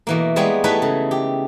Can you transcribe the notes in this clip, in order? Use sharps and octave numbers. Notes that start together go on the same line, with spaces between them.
B2 E3 A#3
G3 G#3 A#3 B3 G#4 C#5
A3 D#4 E4 A4 B4 C#5
C#3
G4